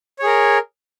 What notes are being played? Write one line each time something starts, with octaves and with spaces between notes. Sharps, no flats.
G#4 A#4 C#5